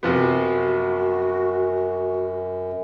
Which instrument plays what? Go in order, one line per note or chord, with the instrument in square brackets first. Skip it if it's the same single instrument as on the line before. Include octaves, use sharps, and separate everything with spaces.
[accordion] F#2 [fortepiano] C3 F3 B3 [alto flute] F#4